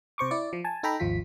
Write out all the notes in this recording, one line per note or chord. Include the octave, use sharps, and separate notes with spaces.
C3 C5 C#6 D6
E4 D5
F3
G#5 A5
D#4 A4 G5 A#5 B5
G#1 D#2 F3 F4 B6